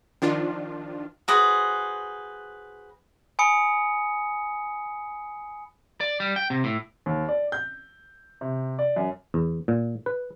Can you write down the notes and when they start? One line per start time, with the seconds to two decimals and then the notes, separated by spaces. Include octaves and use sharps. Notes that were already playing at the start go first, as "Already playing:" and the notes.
0.22 D#3 F3 D4 F4
1.28 F#4 G#4 B4 C5
3.39 G#5 B5 D#6 C#7
6.00 D5
6.20 G3
6.36 G5
6.50 C3
6.64 A2
7.06 D#2
7.29 D5
7.52 G6
8.41 C3
8.79 D5
8.96 F#2
9.34 E2
9.68 A#2
10.06 B4